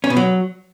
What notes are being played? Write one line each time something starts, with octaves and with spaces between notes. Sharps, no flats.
C#4
B2
F#3